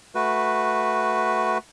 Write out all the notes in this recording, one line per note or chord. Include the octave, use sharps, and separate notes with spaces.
A3 F#4 B4